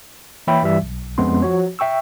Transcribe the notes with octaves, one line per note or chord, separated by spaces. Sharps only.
E3 A#3 C#5 E5 G5 B5
G2 E3 G3 E5
B1
F2 G#3 B3 C#4 C6
F3 F#4 C#5
E5 G5 C#6 E6